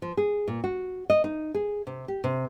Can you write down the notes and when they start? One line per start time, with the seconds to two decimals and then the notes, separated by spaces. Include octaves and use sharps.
0.02 F3
0.17 G#4
0.48 A#2
0.64 F#4
1.10 D#5
1.24 D#4
1.54 G#4
1.87 C3
2.08 G4
2.24 C3